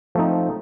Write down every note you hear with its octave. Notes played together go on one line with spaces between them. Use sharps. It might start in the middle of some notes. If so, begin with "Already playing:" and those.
F3 A3 C4 D#4